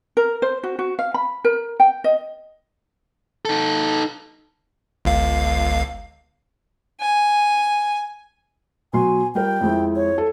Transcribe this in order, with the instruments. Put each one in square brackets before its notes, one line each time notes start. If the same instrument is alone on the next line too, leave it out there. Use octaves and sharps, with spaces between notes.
[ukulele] A#4
C5
F#4
F#4
F5
B5
A#4
G5
D#5
[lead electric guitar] D#4 A4
[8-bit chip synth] G1 C#2 F5
[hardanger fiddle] G#5
[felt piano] B2 F#3 C6 [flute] G#5
[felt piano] G3 F4 A#4 [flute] G5
[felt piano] F2 G#3 E4
[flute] C#5
[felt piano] A4